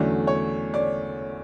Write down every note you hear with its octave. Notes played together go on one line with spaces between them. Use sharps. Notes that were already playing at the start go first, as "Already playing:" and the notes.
Already playing: E2 D3 F#3 A3 C#4 D5
C#5
D5